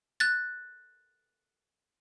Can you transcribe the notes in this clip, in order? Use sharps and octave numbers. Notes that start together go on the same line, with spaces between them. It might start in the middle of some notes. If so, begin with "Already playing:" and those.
F#6 A6